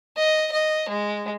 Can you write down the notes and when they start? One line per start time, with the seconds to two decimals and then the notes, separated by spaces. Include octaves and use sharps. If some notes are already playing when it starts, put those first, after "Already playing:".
0.17 D#5
0.51 D#5
0.89 G#3